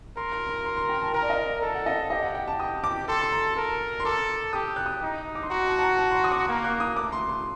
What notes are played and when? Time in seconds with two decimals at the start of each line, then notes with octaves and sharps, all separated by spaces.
0.17 A#4 C6
0.32 A#5
0.49 A#5
0.65 C6
0.77 C6
0.89 G5
1.01 A5
1.14 A#4 A#5
1.23 D5
1.30 D#5
1.46 D5
1.62 A4 A5
1.74 F#5
1.86 D#5
2.10 G4 D#5
2.22 F#5
2.35 G5
2.48 A5
2.60 D#6
2.84 D6
3.08 A4 C6
3.21 C6
3.32 A#5
3.57 A#4
4.00 C6
4.05 A4 D6
4.53 G4 D#6
4.76 F#6
4.86 D#6
5.03 D#4
5.35 D6
5.43 C6
5.50 F#4 A#5
5.67 A5
5.79 A5
5.83 A#5
5.99 A5
6.11 C6
6.15 A#5
6.24 D#6
6.32 D6
6.48 A#3
6.64 F#6
6.80 D#6
6.96 A3 D6
7.12 C6
7.29 C6